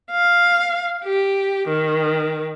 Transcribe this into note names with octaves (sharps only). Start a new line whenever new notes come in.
F5
G4
D#3